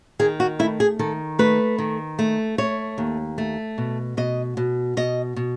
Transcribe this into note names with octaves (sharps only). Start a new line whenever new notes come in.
D#3 G#4
F#4
A3 E4
G#4
D#3 A4
A3 B4
D#3
A3
A3 C#5
D#2
A3
B2
B2 D#5
B2
B2 D#5
B2